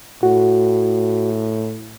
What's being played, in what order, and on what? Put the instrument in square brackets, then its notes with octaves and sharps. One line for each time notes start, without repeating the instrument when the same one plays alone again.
[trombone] A2 [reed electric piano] F#4